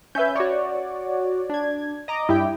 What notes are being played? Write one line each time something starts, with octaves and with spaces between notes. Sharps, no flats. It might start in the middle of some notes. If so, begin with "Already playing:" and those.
C#4 B4 E5 G#5 G6
F#4 C#5 D5
D4 G#6
D#5 A#5 D6
G2 E4 G4 G5